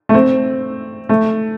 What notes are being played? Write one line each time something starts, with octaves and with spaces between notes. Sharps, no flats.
A3
C4
A3